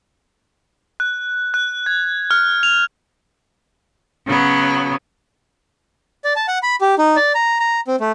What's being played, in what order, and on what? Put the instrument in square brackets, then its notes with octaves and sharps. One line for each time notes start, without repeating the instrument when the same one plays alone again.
[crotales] F#6
F#6
G#6
F6
F7
[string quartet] C#3 F#3 B3
[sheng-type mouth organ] D5
A5
F#5
B5
G4
D#4
D5
A#5
A#5
C4
A3